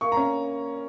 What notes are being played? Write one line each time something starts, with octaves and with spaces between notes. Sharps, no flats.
A#3 C#6
A#5
C#4